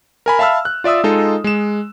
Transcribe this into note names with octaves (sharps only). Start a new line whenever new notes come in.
A#4 G#5 B5
E5 F5 A5 B5 E6 F6
F#6
F4 D5 E5 D#6 E6
G#3 D#4 F4 A4 D#5
G#3 E7